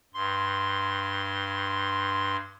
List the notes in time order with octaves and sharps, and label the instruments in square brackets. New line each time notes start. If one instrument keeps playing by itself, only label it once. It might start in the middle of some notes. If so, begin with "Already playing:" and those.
[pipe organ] G2 C6